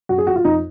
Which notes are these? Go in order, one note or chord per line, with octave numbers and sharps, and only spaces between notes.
F#2 F#4
G#4
F3 F#4
F4
F2 D#4